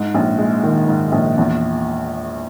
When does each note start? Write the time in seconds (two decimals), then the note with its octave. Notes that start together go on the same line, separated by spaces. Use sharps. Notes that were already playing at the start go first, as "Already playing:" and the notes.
Already playing: G#2
0.14 A#1
0.38 G#3
0.63 D#3
0.88 G#2
1.12 A#1
1.37 E2